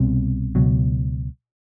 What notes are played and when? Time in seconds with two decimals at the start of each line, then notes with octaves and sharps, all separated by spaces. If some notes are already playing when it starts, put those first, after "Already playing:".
Already playing: C2 B2 G3 C4
0.55 C#2 B2 F#3